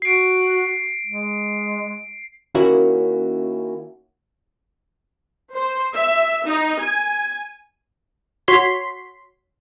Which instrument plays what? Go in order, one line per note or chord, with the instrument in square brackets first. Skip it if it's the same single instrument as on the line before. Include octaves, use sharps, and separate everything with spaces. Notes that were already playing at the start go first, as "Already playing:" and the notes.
[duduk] F#4 [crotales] C7 D7
[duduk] G#3
[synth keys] D#3 A#3 C#4 E4 F#4
[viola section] C5
E5
D#4
G#5
[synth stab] F#4 C#5 C6 B6